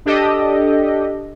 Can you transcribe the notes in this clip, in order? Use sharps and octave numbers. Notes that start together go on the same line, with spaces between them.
D4 G4 A4 D#5